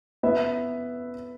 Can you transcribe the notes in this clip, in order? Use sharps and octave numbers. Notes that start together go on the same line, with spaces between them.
B3 E4 B4 E5